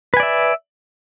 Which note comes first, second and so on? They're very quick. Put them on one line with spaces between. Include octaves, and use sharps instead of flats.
B4 G#5 D5 E5